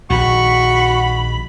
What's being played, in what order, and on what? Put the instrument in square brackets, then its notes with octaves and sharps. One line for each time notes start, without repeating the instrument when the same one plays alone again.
[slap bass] A#1 D#3 [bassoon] F#4 [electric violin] B5 [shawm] C#6